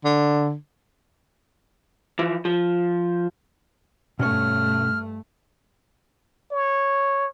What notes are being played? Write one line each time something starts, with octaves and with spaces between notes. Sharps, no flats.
D3
E3 F3
F3
G2 B2 A3 C#4 C#5 F6
C#5